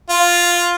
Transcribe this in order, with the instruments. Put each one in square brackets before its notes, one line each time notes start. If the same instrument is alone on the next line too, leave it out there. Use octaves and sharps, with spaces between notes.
[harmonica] F4